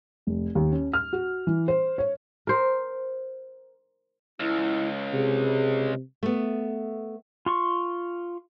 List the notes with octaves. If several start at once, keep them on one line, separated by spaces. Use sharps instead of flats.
F1
D#2
C#4
F6
F#4
E3
C5
C#5
A#4 C5
C#2 E4
C3 G#4
A3 B3
F4 C6 C#6